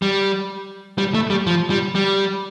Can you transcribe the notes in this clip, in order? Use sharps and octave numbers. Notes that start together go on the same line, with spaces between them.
G3
G3
A3
G3
F3
G3
G3